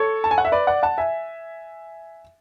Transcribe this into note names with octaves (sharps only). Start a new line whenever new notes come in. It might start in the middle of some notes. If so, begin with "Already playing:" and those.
Already playing: A4 C#5
A5
G#5
F#5
E5
B4 D5
D5 F#5
F#5 A5
E5 G#5